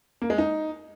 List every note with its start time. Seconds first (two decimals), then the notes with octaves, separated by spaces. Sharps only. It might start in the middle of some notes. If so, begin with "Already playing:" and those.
0.22 A#3
0.30 G#3
0.38 D#4